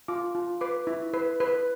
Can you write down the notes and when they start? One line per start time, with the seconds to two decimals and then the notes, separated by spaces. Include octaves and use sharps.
0.08 F4 D6
0.35 F4
0.61 B4 D6
0.87 E4
1.13 B4
1.40 B4